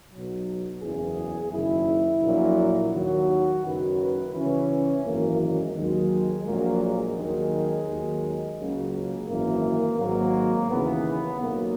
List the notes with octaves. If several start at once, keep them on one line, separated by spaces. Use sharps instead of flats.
B1 B2 F#3
F#1 E2 C#3 G#4
F#1 F#2 D#3 E4
A#1 A#2 F#3
D#2 D#3 F#3 F#4
F#1 F#2 D#3 F#3 B4
B4
C#2 C#3 E3 C#4
G#1 F#2 E3 A#3
G#3
D#2 D#3 F#3 G#3
A#1 A#2 F#3 A#3
G#3
D#2 D#3 F#3
D#2 D#3 F#3
C#2 C#3 F#3 A#3
G#1 F#2 E3 A#3
G#1 G#2 F#3 A#3
D#2 C#3 E3 B3
B1 A#2 F#3 A#3